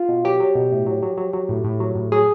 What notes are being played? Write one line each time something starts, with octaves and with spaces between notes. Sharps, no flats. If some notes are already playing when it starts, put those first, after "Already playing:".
Already playing: F4
B2
F#3 G4
F#3
B2
A2
F#3
F#3
F#3
F#3
A2
A2
F#3
A2
F#3 G#4